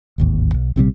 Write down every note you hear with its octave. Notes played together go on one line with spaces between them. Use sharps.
D1 G#1 D#2
B1
A#1 C3 E3 G3